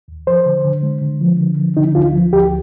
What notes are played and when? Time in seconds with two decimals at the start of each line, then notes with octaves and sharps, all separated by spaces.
0.08 D#2
0.27 F3 C5
0.46 D3
0.64 D3
0.83 G#3
1.01 D3
1.21 F3
1.40 D3
1.57 F3
1.77 D3 D#4
1.95 D2 F4
2.13 F3
2.32 D2 G4